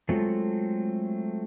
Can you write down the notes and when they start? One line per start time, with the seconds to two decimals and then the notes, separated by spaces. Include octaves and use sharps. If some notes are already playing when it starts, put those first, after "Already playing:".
0.09 F#3 G#3 A3 C4 F4 A4